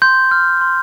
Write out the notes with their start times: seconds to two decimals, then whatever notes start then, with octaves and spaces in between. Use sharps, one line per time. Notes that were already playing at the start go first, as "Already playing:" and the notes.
0.02 C6 G6
0.31 F6
0.61 C6